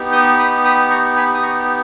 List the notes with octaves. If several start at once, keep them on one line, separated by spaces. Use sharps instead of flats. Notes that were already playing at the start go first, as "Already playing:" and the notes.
Already playing: B3 D#4 G4
D#6 G6
B5 D#6
B5 D#6
A#5 C#6
G#5 B5
D#6
A#5 C#6